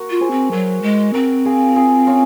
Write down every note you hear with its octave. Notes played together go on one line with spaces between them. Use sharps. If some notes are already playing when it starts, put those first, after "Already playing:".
Already playing: F#4 A#4
F4
G#4 C5
C4
F#3 F#4 A#4
G#3
C4 F#4 A#4
F4 G#4
F4 G#4
C#4 F4